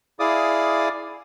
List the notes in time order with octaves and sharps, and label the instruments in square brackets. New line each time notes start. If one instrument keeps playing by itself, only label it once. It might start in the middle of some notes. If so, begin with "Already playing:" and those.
[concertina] E4 G#4 D5 F5 D6 D#6